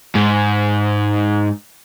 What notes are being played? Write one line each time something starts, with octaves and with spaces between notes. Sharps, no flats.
G#2